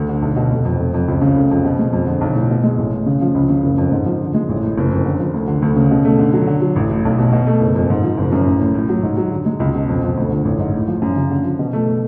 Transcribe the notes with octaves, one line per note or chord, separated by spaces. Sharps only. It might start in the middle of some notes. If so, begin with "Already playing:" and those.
Already playing: D2
D3
B1
B2
F1
F2
F1
F2
C#2
C#3
F1
F2
B2
G#3
F2
D3
B1
A2
B2
G#3
A1
A2
C#3
F3
C#2
C#3
F#1
F2
G#2
F3
D3
G#3
A1
A2
F#1
F2
D3
F3
D2
D3
D2
C#3
B2
A3
D3
F#3
D3
F#3
A1
A2
B1
B2
B2
A3
F#1
F2
G#2
F3
F#1
F#2
A1
A2
A2
F#3
G#2
F#3
D3
G#3
C#2
B2
F2
F3
D2
D3
A1
G#2
A2
F3
F#2
C#3
D3
F3
B2
A3